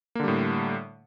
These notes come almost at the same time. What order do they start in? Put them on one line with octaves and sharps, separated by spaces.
A#3 D3 G3 A2